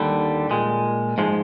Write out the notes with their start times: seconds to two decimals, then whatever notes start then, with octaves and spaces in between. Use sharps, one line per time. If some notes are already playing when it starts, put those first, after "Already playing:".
Already playing: D#2 D3 G3
0.50 A#2 G#3
1.18 G#2 F3 G#3